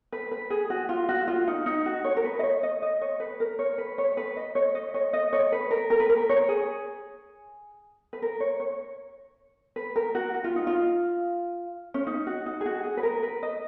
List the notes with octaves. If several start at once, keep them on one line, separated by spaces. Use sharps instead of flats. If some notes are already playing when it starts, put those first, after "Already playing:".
B4
B4
G#4
F#4
F4
F#4
F4
D#4
D#4
F#4
C#5
A#4
B4
D#5
C#5
D#5
D#5
C#5
B4
A#4
C#5
B4
C#5
B4
D#5
C#5
D#5
C#5
D#5
C#5
B4
A#4
A#4
B4
A#4
C#5
G#4
B4
A#4
C#5
C#5
B4
A#4
F#4
F#4
F4
D#4
F4
C#4
D#4
F#4
D#4
G#4
F#4
G#4
B4
A#4
B4
D#5